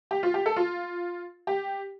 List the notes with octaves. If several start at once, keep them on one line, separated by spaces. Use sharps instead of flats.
G4
F4
G4
A4
F4
G4